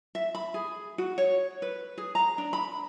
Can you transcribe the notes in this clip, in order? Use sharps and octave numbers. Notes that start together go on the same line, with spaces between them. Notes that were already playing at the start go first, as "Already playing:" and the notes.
E5
B5
G#4
F#4
C#5
B4
G#4
A#5
D4
B5